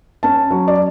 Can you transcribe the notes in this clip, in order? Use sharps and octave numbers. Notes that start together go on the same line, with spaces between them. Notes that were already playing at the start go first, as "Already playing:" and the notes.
C#4 A5
F#3
D5